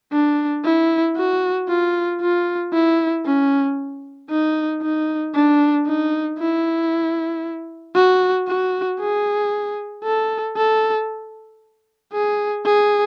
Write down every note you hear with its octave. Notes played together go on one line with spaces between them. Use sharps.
D4
E4
F#4
F4
F4
E4
C#4
D#4
D#4
D4
D#4
E4
F#4
F#4
G#4
A4
A4
G#4
G#4